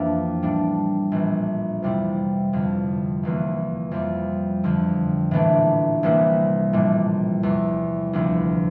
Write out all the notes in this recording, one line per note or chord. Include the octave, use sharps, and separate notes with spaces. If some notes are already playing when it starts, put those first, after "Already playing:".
Already playing: F2 E3 A#3 D4
A2 G3 D4
A#1 A2 E3
F2 C3 G3 C4 E4
G1 F2 D3
F1 E2 E3 A#3
F2 E3 G3 C4
F2 D3 F3
A#1 A2 E3 A3 D4
C2 C3 E3 A#3 E4
A#1 A2 G3
E2 C3 G3
D2 C3 F3 A#3 E4